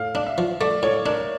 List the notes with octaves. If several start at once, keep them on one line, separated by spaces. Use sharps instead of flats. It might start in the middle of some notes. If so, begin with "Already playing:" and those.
Already playing: A2 F5
D4
E5
F3
A3 D5
A2 C#5
D4 A#4